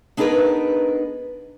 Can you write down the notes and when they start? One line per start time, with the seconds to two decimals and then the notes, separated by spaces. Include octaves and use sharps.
0.17 B3 D4 D#4 G#4 A#4 B4